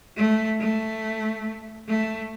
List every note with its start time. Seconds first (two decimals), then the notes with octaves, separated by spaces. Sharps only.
0.17 A3
0.60 A3
1.88 A3